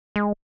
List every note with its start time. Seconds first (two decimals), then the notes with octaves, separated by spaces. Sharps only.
0.16 G#3